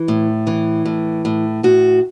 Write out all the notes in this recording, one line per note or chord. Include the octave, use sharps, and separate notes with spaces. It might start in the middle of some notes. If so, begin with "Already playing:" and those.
Already playing: E3
A2
E3
A2
A2
A2 F#4